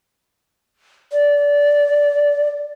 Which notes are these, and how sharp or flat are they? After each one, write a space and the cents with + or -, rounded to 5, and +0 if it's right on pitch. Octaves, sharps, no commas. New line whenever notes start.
D5 -20